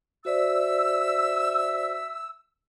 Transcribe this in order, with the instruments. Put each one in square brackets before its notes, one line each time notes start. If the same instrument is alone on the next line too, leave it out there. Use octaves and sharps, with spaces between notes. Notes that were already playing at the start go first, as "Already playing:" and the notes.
[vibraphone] F#4 C5 D5 [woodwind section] E5 E6